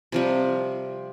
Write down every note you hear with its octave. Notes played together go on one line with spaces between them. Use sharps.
C3 F3 G3